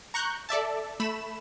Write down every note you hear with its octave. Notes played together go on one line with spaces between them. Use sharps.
A#5 C#6 F#6 G6
A4 D5 E5 A5
A3 B5 E7